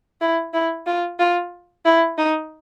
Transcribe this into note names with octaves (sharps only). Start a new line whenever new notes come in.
E4
E4
F4
F4
E4
D#4